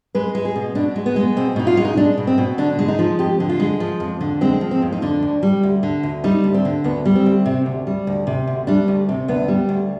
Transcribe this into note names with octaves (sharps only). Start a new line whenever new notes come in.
G#3 B4
G#3
G#4
B2
B2 D4
G#3
B3
G#3
B2 C4
B2 D#4
F4
G#3
D#4
G#3 D4
B2
C4
B2
D3 D4
G#3
D#4
F3
F2 G4
D3
F4
G#3
F3
F2
D3
G#3 C4
F3
C4
F2
D#4
D3 D4
D2
G3
D2
D3
D2
G3 D#4
D2
C4
D3
D2 B3
G3
C4
D2
C3
D2
G3
D2
C3
D2
G3 D4
D2
C3
D2 B3
G3
D2